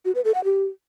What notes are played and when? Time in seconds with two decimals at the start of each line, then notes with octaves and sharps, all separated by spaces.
0.05 F#4
0.15 B4
0.25 A4
0.34 F#5
0.44 G4